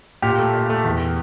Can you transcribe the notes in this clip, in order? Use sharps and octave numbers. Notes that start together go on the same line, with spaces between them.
A#2 G4
A3
A#2
A3
E2